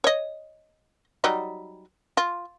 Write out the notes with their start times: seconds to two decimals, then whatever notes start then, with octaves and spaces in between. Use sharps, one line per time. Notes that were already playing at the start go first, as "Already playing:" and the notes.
0.04 C#5 D#5
1.24 F#3 G3 D#4
2.17 F4